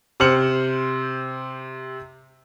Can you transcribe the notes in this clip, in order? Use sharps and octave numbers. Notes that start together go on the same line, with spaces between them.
C3 C4 C5 F6 C#7 F#7